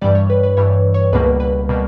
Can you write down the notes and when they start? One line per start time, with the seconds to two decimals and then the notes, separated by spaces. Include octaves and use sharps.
0.01 G2 E3 G3 D5
0.15 C#5
0.30 B4
0.43 B4
0.57 G2 E3 G3 C#5
0.94 C#5
1.12 C#2 B2 G3 A#3 B4
1.40 B4
1.69 B2 G3 A#3